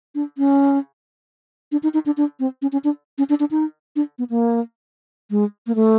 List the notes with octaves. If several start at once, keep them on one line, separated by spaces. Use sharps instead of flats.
D4
C#4
D4
D#4
D#4
D4
D4
C4
C#4
C#4
D4
C#4
D4
D4
D#4
D4
B3
A#3
G#3
A#3
A3